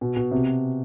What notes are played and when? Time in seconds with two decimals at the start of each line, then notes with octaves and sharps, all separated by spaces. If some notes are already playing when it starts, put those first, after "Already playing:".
0.01 B2
0.16 B2
0.32 C3